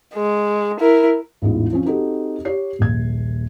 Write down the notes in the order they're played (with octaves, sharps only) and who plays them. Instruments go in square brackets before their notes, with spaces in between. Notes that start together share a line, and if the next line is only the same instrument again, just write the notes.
[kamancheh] G#3
E4 A#4
[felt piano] A1 E2 G#2 F4
F3 C4 C#4 F4
C4 D#4 F#4 G4 A4
G4 C#5 C7
D#1 A#1 G#6